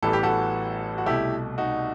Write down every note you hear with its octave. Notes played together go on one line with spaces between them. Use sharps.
A1 A2 E3 G3 B3 A4
G4
F#4 A4
F#4
C2 B2 A3 E4 G4
D#4 F#4